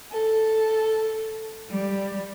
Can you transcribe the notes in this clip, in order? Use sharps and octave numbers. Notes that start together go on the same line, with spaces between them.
A4
G3